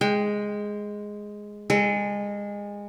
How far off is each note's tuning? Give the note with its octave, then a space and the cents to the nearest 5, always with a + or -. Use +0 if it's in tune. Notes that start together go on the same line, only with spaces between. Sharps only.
G#3 +0 G5 +30
G#3 -25 A4 +0